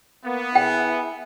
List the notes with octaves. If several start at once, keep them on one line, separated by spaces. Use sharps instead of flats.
A#3 B3
E4 G#4 G5